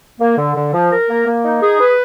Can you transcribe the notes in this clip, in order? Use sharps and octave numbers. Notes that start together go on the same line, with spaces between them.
A#3
D3
D3
F3
A#4
A#3
A#3
D#4
G#4
B4